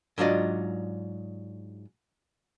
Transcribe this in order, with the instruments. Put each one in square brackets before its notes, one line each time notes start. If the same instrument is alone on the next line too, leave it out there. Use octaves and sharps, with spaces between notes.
[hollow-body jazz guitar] G#2 F#3 D4 F4 D5 D#5